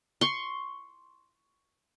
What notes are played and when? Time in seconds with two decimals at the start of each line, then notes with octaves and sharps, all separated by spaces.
0.21 C6 C#6